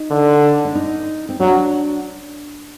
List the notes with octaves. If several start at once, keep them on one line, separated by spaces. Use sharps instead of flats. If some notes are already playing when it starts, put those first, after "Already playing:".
Already playing: D#4
D3
D4
D#4
C4
F#3 D4